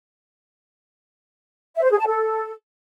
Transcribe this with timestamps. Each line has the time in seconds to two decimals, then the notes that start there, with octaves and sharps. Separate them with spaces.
1.76 E5
1.83 C5
1.91 G#4
1.99 A5
2.07 A4